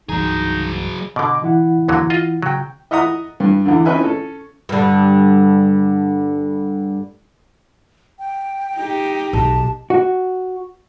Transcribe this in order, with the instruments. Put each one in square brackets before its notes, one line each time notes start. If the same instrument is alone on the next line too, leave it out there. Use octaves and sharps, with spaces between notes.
[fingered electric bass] C2 G2 E3 [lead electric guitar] F#3 G#4 [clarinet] D#4
[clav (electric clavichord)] B2 D3 [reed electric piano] D#5 D6
[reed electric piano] E3 E4 F#5
[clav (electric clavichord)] D#2 D3 F#3
F4 D#5
[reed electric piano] C#3 G5 [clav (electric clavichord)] F#3
[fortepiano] D#5 E5 F#5 A#5 D#6
G2
E2 D3
C4 C#4 D#4 B4 E5 G#5
C#4 A4
[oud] G2 D3
[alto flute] G5
[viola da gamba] D#4 G4
[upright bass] B1 [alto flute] A5
[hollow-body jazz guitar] F#4